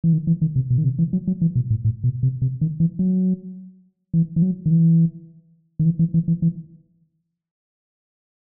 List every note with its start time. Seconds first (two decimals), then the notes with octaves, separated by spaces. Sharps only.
0.04 E3
0.13 D#3
0.27 E3
0.42 D#3
0.56 C3
0.70 B2
0.78 D#3
0.84 C3
0.99 E3
1.13 F#3
1.27 F#3
1.42 E3
1.55 B2
1.70 A2
1.85 A2
2.04 B2
2.23 C3
2.42 C3
2.61 D#3
2.80 E3
2.99 F#3
4.14 E3
4.36 E3
4.42 F#3
4.66 D#3
4.71 E3
5.79 D#3
5.85 E3
5.99 E3
6.14 E3
6.28 E3
6.42 E3